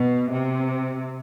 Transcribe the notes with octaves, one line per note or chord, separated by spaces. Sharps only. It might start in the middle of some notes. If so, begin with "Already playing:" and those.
Already playing: B2
C3